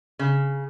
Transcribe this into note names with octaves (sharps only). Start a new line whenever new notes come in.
C#3